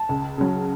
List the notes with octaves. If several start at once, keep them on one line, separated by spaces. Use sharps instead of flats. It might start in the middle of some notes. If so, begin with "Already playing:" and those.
Already playing: A5
C#2
C#3 F#3